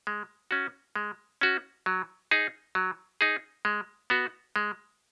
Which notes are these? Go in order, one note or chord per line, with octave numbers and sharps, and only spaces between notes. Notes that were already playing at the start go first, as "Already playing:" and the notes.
G#3
C#4 F#4
G#3
C#4 F#4
F#3
D#4 G#4
F#3
D#4 G#4
G#3
B3 F#4
G#3